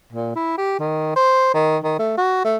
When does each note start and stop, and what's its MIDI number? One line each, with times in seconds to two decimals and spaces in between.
0.12 0.36 46
0.36 0.55 64
0.58 0.79 67
0.79 1.13 51
1.16 1.53 72
1.54 1.78 51
1.84 1.95 51
1.99 2.15 57
2.18 2.40 66
2.45 2.57 57